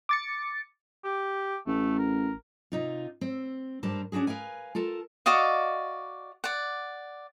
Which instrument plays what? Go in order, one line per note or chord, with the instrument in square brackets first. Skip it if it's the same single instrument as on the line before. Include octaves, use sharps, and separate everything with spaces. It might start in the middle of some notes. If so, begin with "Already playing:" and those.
[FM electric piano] D6 A6 C#7
[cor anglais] G4
[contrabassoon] A1 [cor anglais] A3
[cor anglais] A#4
[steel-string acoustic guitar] C3 D#4 F4
C4
G2 G3 D4 A#4 C5 A5
C#4 D4 F4 F#4 G#4
A#4 B4 F5 G#5
F4 A4 A#4 A5
[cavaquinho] F#4 D5 D#5 F5
D5 F#5